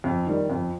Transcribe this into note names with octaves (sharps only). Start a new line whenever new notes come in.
F2
D#3 G3
F2